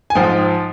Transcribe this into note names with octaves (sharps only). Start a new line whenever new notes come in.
G#5
G#2 F3 G5